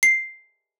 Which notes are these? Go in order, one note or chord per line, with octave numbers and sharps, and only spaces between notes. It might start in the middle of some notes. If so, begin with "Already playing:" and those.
C7